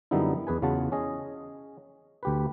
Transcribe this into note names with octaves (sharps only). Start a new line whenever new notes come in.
F#2 D3 G3 B3 D#4 E4
E2 G#4 B4 G#5
E2 C#3 F4 F#4 F#5 A5
C#4 G#4 D#5
D2 G4 B4